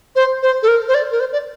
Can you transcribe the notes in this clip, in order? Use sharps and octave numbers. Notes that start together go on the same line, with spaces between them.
C5
C5
A4
A#4
C5
D5
A#4
C5
D5